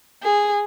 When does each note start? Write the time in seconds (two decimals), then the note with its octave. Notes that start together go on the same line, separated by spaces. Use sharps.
0.23 G#4